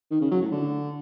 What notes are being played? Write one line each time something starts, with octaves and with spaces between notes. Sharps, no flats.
D#3
C#3
F#3
A2
D3